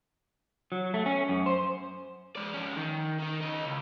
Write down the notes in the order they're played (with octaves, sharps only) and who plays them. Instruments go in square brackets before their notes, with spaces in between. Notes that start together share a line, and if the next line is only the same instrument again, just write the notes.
[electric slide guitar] F#3
A3
C#4
F#2
C5
[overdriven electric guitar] G#3 D5
F3 C#4
D#3
D#3 D#4
C#4 D#5
C#2